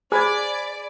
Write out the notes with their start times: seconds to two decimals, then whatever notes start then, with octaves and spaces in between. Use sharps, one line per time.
0.12 G#4 C5 D5 G#5 B5 G#6